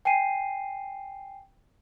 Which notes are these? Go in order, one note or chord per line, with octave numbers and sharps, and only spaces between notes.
G5 G#5 C7 D#7